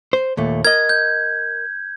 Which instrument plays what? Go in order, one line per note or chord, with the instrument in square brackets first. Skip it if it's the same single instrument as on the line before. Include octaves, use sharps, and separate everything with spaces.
[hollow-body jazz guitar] C5
D#2 A#2 A3
[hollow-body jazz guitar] A#4 D#5 [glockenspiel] G#6
[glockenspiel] G6